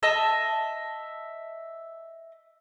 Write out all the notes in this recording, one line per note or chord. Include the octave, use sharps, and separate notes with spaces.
D#5 E5 A5